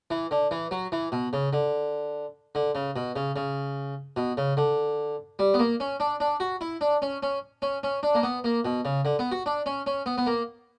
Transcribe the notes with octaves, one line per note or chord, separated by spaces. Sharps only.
E3
D3
E3
F#3
E3
B2
C#3
D3
D3
C#3
B2
C#3
C#3
B2
C#3
D3
G3
B3
A#3
C#4
D4
D4
F#4
E4
D4
C#4
C#4
C#4
C#4
D4
A#3
B3
A#3
B2
C#3
D3
B3
F#4
D4
C#4
C#4
B3
B3
A#3